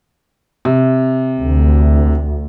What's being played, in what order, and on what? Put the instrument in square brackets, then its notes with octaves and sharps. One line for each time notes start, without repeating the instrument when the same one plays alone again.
[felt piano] C3
[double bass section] D2